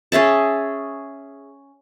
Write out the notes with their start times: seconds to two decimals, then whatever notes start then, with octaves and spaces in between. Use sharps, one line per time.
0.12 C#4 G#4 E5 A5